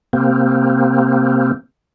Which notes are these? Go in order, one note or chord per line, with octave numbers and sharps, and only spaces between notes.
C3 A#3 C4